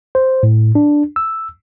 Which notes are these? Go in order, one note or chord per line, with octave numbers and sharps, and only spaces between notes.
C5
A2
D4
E6